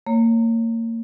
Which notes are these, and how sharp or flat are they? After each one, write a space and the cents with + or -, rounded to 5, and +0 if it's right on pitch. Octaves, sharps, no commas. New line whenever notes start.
A#3 -30 C#5 +0